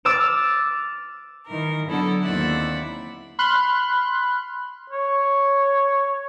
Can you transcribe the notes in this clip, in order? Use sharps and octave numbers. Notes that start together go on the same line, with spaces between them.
D6 E6 F6 A6 D7 E7
D#3 E3 A#4
D3 F#3 B3 E4 A4
D#2 C4 E4 D5 E5 F#5
B5 C6 F6 F#6
C#5